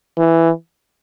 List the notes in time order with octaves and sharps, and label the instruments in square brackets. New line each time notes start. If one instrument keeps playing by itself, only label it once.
[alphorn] E3